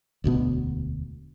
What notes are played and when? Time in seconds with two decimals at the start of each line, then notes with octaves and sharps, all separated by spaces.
0.24 E1 D2 B2 B3